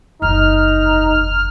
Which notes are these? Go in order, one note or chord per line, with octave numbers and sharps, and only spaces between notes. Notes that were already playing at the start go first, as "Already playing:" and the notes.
F#1 E2 D#4 F6